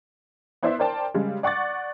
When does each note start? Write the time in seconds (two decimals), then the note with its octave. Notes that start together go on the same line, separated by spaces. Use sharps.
0.63 B3 E4 C5 D5 E5
0.79 A#4 C5 D5 G5 A5
1.14 C#3 G3 G#3
1.43 D5 F#5 C#6 D6 A6